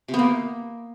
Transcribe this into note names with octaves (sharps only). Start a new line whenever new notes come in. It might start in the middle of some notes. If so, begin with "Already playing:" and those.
C3
B3
A#3